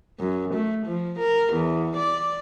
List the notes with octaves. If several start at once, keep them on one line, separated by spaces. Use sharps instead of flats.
F#2
A3
F3
A#4
E2
D5